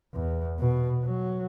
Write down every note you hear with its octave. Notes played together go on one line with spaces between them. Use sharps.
E2
B2
F#3